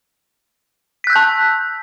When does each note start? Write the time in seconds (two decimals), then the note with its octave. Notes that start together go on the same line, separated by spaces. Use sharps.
1.04 B6
1.07 F#6
1.10 E6
1.13 G6
1.16 A5